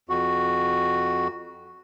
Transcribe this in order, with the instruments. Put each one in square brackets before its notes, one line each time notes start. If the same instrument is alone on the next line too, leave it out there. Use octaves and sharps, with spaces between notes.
[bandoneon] F2 F#4